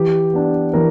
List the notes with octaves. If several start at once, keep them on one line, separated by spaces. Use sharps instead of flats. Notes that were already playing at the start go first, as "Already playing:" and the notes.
Already playing: E3 G4
B3 D4
E3 A#4